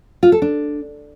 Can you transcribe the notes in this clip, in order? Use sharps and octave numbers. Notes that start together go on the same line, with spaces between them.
F4
A4
D4